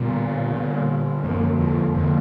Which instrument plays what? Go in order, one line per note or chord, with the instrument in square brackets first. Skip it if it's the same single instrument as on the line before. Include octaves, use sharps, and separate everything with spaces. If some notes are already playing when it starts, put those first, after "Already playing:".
Already playing: [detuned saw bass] A#2 [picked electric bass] D3 G3 B3
[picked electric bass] D3 G3 B3
[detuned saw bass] F#2 [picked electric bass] D3 F3 A#3
[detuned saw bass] F2
[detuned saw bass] F2 [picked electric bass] D3 F3 A#3